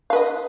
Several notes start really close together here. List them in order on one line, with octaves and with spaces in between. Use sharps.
F5 B4 D#5